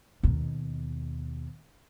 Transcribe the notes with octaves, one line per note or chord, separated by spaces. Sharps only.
D#2 B2